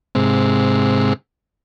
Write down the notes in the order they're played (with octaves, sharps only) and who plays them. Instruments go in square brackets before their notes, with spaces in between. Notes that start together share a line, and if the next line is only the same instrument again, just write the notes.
[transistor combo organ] G#2 C3